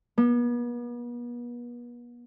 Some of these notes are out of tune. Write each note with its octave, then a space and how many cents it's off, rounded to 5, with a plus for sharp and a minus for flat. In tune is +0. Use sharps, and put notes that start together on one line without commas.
B3 -40